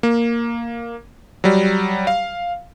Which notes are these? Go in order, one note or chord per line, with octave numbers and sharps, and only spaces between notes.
A#3
F#3 G3
F5